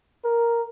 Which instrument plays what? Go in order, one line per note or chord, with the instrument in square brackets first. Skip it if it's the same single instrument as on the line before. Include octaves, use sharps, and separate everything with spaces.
[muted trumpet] A#4